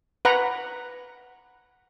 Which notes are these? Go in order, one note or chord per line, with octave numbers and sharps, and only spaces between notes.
B4 F#5 A#5